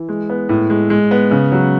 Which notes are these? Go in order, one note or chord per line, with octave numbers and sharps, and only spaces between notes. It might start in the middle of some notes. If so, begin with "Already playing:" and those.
Already playing: E3
G#3
B3
A2
G#3
G#3
B3
C#3
F#3